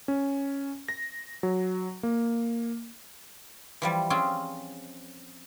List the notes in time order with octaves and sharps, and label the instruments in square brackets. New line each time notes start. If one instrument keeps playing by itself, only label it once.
[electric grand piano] C#4
A#6
F#3
A#3
[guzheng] E3 F3 G3
C4 C#4 F4 G#4